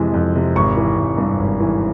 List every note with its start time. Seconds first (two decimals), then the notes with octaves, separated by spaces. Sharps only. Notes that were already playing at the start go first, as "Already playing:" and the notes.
Already playing: F2 C3 E3 G#3
0.14 F2
0.35 C3
0.56 G#1 C#6
0.77 E3
0.98 G#1
1.18 G2
1.40 G#1
1.60 E3